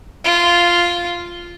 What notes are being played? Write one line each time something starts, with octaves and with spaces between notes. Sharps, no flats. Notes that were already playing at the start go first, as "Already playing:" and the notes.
F4